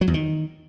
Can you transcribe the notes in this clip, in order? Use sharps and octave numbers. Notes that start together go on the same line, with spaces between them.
F#3
E2
D#3